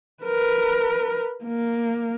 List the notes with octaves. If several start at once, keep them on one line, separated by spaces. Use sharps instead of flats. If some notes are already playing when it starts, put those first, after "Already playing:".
A#4 B4
A#3